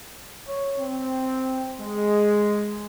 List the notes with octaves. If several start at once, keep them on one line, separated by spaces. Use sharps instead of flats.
C#5
C4
G#3